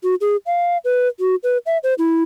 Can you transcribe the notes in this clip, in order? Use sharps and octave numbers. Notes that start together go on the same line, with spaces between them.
F#4
G#4
F5
B4
F#4
B4
E5
C5
E4